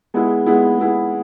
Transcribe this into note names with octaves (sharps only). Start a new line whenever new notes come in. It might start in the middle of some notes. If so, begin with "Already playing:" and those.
G#3 B3 E4 G#4
G#3 B3 E4 G#4
G#3 B3 E4 G#4